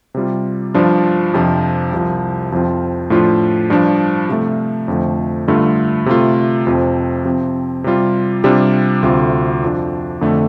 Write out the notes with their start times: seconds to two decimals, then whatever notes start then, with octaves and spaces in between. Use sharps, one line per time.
0.14 C3 G3 F4
0.74 G2 F3 D4 F4
1.34 F2 C3 F3 D4
1.92 C2 C3 F3
2.52 F2 F3 C4 F4
3.10 A2 F3 D4 F4
3.70 G2 F3 D4
4.29 C3 F3 A3
4.88 F2 D3 F3 A3
5.48 G2 D3 A3 F4
6.06 C3 A3 F4
6.67 F2 C3 F3 C4
7.25 C3 F3 C4
7.84 C3 G3 F4
8.44 C3 G3 D4 F4
9.03 D2 C3 A3 F4
9.62 F2 F3 D4
10.21 F2 D3 A3